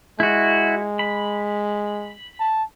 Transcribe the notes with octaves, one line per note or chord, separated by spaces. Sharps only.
G#3 E4 F#4
B5
A5